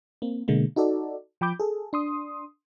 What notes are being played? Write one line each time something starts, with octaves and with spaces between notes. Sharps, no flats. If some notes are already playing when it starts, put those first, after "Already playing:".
A#3 C4
B2 D3 G#3 A#3
D#4 F#4 A4 D5
F3 G5 B5 D6 G6
G#4 A4
D4 C6 D#6